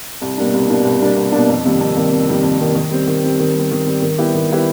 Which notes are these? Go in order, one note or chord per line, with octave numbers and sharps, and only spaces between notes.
C2
B2 G3 A#3 D4
C2
B2 G3 A#3 D4
C2
B2 G3 A#3 D4
C2
B2 G3 A#3 D4
F2
C3 D#3 G3 A#3
F2
C3 D#3 G3 A#3
F2
C3 D#3 G3 A#3
F2
C3 D#3 G3 A#3
D#3
G3 C4
D#3
G3 C4
D#3
G3 C4
D#3
G3 C4
D#3
G3 B3 E4 G4
D#3
G3 B3 E4 G4